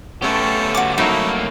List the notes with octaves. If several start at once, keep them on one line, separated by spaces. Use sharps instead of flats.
A3 B3 C#4 G4 A4
F#4 D6
C2 F#3 A3 A#3 D#4 E4 E5